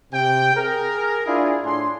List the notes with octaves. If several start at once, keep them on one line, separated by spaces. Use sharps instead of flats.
C3 G5
G#4 A#4
D4 E4 F4 G#4
A2 D4 G#5 C6